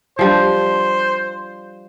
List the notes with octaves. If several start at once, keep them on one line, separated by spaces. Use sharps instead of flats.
F3 G3 D4 C5